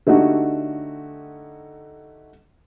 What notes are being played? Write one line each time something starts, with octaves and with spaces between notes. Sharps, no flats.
D3 A3 D#4 F#4 G4